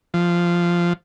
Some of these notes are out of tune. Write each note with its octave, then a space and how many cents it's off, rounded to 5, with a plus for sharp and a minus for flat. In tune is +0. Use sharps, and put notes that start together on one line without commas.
F3 -10